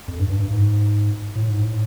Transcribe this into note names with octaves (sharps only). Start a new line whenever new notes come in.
F2
G2
G2
G2
G#2
A2
G#2
A2